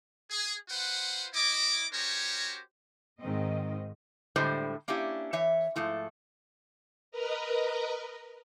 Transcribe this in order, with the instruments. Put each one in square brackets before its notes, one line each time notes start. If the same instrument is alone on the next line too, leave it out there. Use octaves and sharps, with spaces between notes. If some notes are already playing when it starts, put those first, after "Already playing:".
[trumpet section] G#4
F4 B4 C5 F#5
E4 D#5 D6
C#4 F#4 G4 A#4 C5 C#5
[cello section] G#2 D#3 C4 D#5
[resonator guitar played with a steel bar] A2 D3 G3 G#3 C5
A#3 C#4 D4 E4 G4
E3 C#5 E5
G#2 F3 A3 E4
[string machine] A#4 B4 D#5 A#5